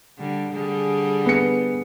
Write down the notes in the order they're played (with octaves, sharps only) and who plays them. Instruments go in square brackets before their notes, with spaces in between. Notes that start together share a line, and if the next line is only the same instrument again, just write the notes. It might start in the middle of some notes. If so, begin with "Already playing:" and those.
[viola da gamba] D3 G3
D3 G3 G#4
[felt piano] B3 C#7